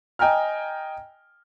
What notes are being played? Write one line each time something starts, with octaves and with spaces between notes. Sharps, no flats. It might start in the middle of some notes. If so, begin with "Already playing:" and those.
D#5 G5 G#5 A#5 F6